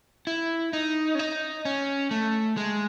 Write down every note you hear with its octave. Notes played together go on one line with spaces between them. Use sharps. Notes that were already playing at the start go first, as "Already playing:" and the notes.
E4
D#4
C#4
D#4
C#4
A3
G#3